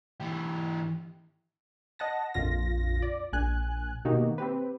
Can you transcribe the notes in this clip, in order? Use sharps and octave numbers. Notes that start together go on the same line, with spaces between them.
E3 G4
D#5 F#5 A5 A#6
A#1 F2 F4 A#6
D5
A#1 G#5 F#6
B2 D#3 A#3 D#4 F#4 G4
C4 G4 B4